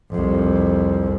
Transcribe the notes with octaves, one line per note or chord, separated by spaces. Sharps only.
C2 F2